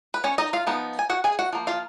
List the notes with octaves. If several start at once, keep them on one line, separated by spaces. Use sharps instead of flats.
B4
C#4 C#5
D#4 D#5
F4 F5
F3 B3 D#4
G#5
F#4 F#5
G#4 G#5
F#4 F#5
F3 A#3
F4 F5